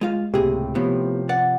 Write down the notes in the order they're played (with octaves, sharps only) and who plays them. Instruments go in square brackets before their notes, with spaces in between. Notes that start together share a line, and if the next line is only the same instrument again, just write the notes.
[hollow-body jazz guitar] G#3 F4 F5
[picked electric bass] C#2 A2 C3 [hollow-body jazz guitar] A#3 G#4 [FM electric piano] G4
[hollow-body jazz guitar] A2 B3 [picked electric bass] C3 F3
[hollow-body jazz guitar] D5 [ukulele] F#5